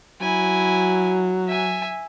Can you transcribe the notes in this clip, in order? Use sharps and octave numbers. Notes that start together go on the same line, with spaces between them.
F#3 E4 G#5
E5 G#5